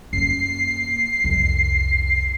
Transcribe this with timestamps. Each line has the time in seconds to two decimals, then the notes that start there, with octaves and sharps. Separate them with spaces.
0.13 F#2 A#3 C7
1.24 C2 F2